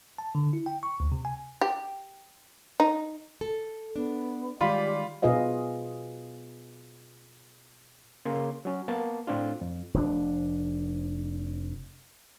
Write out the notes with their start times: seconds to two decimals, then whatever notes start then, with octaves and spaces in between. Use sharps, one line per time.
0.18 A5
0.35 D3
0.53 E4
0.66 G5
0.83 C#6
1.00 D2
1.12 C3
1.25 G#5
1.61 G4
2.80 D#4
3.41 A4
3.96 B3 D4
4.61 D#3 G3 G#3 F4 G4 D5 B5
5.22 B2 F4 G#4 B4 D#5 F5
8.25 C#3 A#3 C6
8.65 F#3 C#4
8.88 A#3 B3 A5
9.27 A2 C4 D4 F4
9.61 F2
9.94 F1 C3 D4